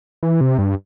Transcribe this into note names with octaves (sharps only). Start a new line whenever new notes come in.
E3
C3
G2